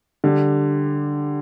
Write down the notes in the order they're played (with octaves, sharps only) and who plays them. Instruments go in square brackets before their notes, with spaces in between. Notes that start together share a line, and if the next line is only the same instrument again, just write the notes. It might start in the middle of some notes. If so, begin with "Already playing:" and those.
[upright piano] D3 G3